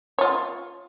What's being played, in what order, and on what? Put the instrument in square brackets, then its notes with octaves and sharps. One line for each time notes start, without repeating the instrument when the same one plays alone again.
[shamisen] F4 C#5